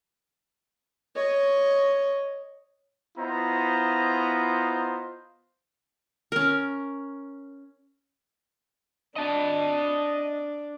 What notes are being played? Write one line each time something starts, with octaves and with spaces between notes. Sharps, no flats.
C#5 D#5
B3 E4 F4 C5 D#5 A#5
C#4 A#4
D4 D#5 A5